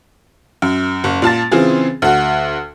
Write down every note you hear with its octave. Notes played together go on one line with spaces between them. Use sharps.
F#2
F#1
A#2 F4 A5 A6
C#3 E3 C4 F4 G#4
D2 F#4